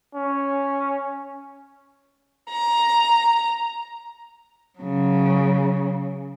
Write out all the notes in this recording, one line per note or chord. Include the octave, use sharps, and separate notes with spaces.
C#4
A#5
C#3 F#3